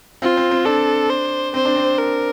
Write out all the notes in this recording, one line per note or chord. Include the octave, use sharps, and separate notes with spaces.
C4 F4
C4
C4
D4 A4
C5
C4 C5
D4
C4
A#4